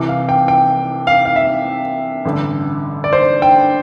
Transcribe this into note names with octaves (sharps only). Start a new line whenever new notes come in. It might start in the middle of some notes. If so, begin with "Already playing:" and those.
Already playing: C2 C3 E3
F5
G5
G5
F5
F5
E5
A1 G2 D3
D5
C5
G5